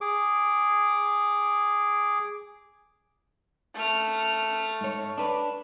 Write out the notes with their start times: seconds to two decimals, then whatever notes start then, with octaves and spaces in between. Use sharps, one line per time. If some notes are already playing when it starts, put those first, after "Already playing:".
0.01 G#4 D6
3.75 A3 F6
4.81 G#2 C#5
5.18 D4 B4